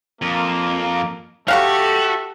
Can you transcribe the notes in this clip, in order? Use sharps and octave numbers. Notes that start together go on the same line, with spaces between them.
F2 A#3
A3 F#4 G4 A4 F5 F#5 C#6